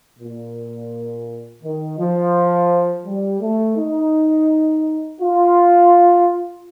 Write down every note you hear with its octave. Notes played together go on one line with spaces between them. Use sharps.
A#2
D#3
F3
G3
A3
D#4
F4